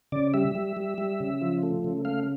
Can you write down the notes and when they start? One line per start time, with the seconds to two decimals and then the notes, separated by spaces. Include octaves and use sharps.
0.12 C#3 D5
0.34 G3 E5
0.55 G3
0.77 G3
0.98 G3
1.20 C#3
1.42 F3
1.63 A3
1.84 C#3
2.05 A3 F5